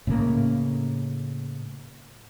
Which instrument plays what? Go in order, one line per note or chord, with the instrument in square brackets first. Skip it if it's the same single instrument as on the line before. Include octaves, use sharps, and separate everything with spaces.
[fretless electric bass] A2 C#3 A#3